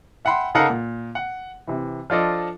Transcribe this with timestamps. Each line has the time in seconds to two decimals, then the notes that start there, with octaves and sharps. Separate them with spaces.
0.25 E5 F#5 G5 B5 C6
0.55 C#3 D#4 A4 A#4 F5 F#5
0.69 A#2
1.15 F#5
1.67 C3 E3
2.10 F3 D4 F4 A4 D5 D#5